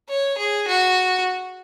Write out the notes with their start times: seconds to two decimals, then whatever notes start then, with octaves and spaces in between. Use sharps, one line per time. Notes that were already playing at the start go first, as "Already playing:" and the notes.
0.09 C#5
0.38 G#4
0.68 F#4